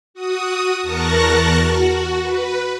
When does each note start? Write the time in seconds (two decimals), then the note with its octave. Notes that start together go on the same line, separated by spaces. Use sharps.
0.14 F#4 D#6
0.82 E2 A#4 A5 C#6 F#6 A#6
1.57 F#4
2.22 B4